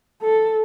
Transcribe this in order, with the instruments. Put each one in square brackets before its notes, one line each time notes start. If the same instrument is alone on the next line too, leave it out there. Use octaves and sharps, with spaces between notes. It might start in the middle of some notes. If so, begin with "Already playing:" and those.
[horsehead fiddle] A4